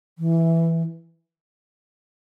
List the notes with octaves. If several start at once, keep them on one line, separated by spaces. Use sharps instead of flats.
E3